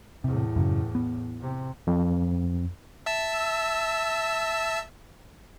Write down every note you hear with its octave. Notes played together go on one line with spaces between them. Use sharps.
E2 A2 C3
F#2 C#3 F#3
B3
C3
F2
E5 A5 E6